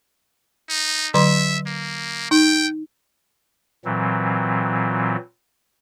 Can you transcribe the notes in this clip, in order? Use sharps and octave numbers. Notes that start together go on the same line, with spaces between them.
D#4
D3 F#3 E5 C6
A#3
D#4 G5
A#2 E3 F#3 C4